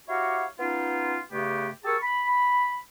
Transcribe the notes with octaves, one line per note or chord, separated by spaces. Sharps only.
E4 F#4 G4 C#5 F5 F#5
B3 C#4 D#4 F4
G2 C#3 A3 B3 G4
G4 G#4 A#4 A5 C#6 E6
B5